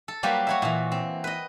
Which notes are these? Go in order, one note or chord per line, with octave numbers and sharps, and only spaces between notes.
A4
F#3 G3 A#3 G4 B4 C5
F#4 C#5 E5
A#2 E3
C4
B4 D#5